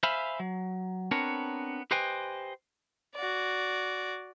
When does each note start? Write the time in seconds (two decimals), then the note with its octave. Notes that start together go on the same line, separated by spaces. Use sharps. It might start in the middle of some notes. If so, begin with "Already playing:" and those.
0.03 C5 E5 F5 G#5 B5
0.40 F#3
1.11 B3 C4 D4 A#4 C#5
1.91 G4 B4 C5 D#5 G5 G#5
3.15 F#4 D5